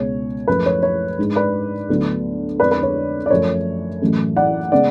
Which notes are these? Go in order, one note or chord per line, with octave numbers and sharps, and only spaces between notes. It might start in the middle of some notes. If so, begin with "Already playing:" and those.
Already playing: C#2 B2 G#3 C#5
F#2 F3 A3 B4
C#5
C#5
G#2 G#3 D4
B4 D5
D2 D3 F#3 B3 D4
F2 D3 G#3 D4 B4 D5
B4
C#5
D5
F#2 F3 A3 C#5
A1 A2 F#3 A3 C#4
D5 F#5
C#3 G#3 B3 D5 F#5